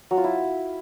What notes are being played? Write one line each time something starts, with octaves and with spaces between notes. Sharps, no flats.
F#3
F4
E4